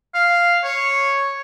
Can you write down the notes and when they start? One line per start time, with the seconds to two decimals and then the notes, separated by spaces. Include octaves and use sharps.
0.15 F5
0.63 C#5